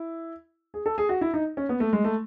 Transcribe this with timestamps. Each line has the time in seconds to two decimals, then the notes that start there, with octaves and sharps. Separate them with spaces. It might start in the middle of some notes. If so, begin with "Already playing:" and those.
Already playing: E4
0.74 G#4
0.86 A4
0.98 G#4
1.09 F#4
1.21 E4
1.34 D#4
1.57 C#4
1.69 B3
1.80 A3
1.93 G#3
2.04 A3